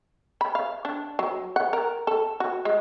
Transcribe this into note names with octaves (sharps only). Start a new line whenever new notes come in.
B5
F5
D4
F#3
F#5
A#4
A4
F#4
G#3